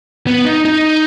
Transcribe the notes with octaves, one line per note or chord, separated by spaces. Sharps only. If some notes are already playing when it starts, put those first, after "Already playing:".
B3
D#4
D#4